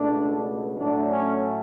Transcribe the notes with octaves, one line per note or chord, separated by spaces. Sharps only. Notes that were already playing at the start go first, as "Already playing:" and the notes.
Already playing: C#2 B2 A3 D4
A2 F#3 A3 D4
C#4